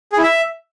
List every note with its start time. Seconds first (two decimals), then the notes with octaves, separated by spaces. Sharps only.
0.13 G#4
0.18 E4
0.23 E5